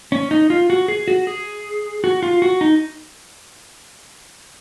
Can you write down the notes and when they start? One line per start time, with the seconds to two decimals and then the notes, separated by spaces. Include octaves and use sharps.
0.12 C#4
0.31 D#4
0.50 F4
0.70 F#4
0.88 G#4
1.08 F#4
1.27 G#4
2.04 F#4
2.23 F4
2.42 F#4
2.61 D#4